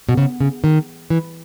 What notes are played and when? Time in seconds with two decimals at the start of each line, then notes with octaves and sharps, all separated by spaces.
0.09 B2
0.17 C#3
0.40 C#3
0.64 D#3
1.10 E3